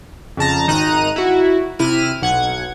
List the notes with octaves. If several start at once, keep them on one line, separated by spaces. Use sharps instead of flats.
F2 C#3 A5 A#5
G#1 D#3 D#4 A#5 F#6 D#7
E4 F#4
C3 E4 F6 D#7
B1 F#5 G#6